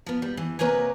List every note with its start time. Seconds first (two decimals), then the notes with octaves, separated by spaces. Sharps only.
0.06 F3 B3
0.22 G3
0.37 E3
0.59 C3 A#3 B4 C#5 D#5 G#5